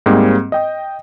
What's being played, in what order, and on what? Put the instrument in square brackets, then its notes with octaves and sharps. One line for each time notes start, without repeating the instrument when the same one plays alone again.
[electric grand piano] G#2 G3 A#3 C4 G#4
D#5 G5 D#6